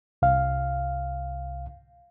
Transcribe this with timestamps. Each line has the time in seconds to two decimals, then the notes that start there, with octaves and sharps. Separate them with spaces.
0.22 C2 F5